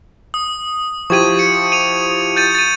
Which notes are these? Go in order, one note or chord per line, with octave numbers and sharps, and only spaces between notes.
D#6
F3 E4 G4 C#6 G#6 D#7
C#7
D#7 F7
G6 A6 D#7
A6 D#7